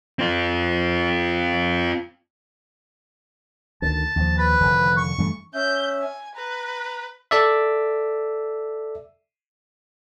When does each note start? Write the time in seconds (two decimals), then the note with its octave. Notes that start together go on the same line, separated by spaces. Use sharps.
0.19 C4 F4
3.82 D2 D#3 A5
4.16 D#2 F3
4.38 B4
4.60 F1 D3 D#3
4.98 C#6
5.18 G2 E3 A3
5.54 C#4 E5 G6
6.02 G#5
6.35 B4 A#5
7.31 A4 D5 E5